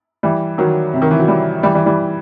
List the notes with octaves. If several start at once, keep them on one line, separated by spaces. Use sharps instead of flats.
E3 G3
D#3 F#3
C3
D#3
E3
F#3
E3 G3
E3 G3
E3 G3
E3 G3